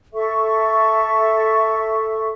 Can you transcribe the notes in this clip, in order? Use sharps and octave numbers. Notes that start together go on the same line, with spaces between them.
A4 E5 C#6